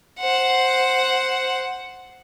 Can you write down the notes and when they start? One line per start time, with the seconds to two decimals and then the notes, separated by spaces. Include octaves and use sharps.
0.20 C5 F#5